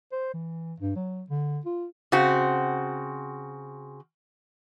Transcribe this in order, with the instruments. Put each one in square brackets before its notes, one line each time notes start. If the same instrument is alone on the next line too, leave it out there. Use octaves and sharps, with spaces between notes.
[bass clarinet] C5
E3
G2
F#3
D3
F4
[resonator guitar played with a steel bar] C#3 C4 F#4